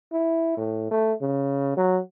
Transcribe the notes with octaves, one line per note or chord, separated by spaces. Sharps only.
E4
A2
A3
C#3
F#3